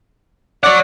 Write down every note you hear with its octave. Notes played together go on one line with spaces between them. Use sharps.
C#5 D5 F#5